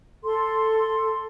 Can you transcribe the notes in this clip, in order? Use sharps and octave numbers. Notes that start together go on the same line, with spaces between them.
A4 C6